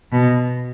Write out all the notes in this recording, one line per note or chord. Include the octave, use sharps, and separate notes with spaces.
B2